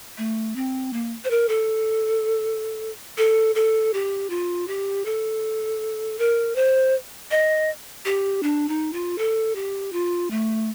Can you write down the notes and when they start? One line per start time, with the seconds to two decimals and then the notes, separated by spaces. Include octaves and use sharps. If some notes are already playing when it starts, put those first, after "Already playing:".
0.18 A3
0.56 C4
0.93 A#3
1.24 C5
1.30 A#4
1.49 A4
3.17 A4
3.55 A4
3.93 G4
4.30 F4
4.68 G4
5.05 A4
6.19 A#4
6.55 C5
7.31 D#5
8.05 G4
8.43 D4
8.69 D#4
8.93 F4
9.18 A4
9.55 G4
9.93 F4
10.31 A3